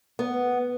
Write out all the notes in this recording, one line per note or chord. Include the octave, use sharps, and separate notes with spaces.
B3